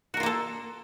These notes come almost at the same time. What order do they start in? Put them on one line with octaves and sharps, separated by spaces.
F#4 A#4 F4 A#3 A4